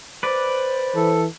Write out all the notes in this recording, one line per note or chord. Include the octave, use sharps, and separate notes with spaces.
B4 C5 D5
E3 A4